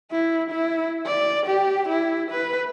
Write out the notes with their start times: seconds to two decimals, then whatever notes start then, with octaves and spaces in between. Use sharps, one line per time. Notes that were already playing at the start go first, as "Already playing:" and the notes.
0.11 E4
0.50 E4
1.06 D5
1.46 G4
1.88 E4
2.31 B4